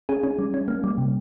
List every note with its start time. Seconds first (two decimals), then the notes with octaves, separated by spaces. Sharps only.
0.09 C#4 G#4
0.23 C#4
0.39 G3
0.54 C#4
0.68 A#3
0.84 G3
0.98 C3